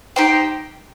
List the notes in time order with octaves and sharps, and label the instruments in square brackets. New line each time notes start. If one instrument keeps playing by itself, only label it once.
[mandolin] D#4 G4 C5 G5